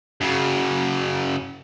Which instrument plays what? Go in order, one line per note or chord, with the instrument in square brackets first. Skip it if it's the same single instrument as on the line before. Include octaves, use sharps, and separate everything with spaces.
[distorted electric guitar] F#2 C#3